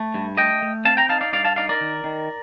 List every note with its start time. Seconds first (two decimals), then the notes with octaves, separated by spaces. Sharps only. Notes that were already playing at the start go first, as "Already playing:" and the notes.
Already playing: A3
0.14 G2
0.37 A3 D#5 G5
0.62 A3
0.85 C4 F5 A5
0.97 G5 A#5
1.09 D#4 F5 A5
1.21 D5 F5
1.33 G2 D5 F5
1.45 F5 A5
1.56 D#4 D5 F5
1.69 A#4 D5
1.81 D#3
2.04 D#3